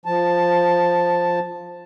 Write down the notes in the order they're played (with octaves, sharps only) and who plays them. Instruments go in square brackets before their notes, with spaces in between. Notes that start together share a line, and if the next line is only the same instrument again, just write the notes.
[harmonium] F3 A5